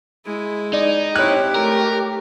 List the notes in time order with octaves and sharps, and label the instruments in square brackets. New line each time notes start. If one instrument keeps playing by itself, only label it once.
[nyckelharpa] G#3 E4
[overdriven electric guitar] D#4 [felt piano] D5
[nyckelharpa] C4 E4 [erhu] G4 [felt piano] C#5 F#6
[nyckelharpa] A3 [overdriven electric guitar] A#4